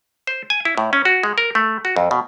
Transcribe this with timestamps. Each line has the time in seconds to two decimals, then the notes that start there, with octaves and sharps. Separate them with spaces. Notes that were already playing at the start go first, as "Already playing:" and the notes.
0.27 C5
0.50 G#5
0.65 E4
0.78 A2
0.93 C#4
1.05 F#4
1.23 G#3
1.38 A#4
1.55 A3
1.85 F#4
1.96 F2
2.11 B2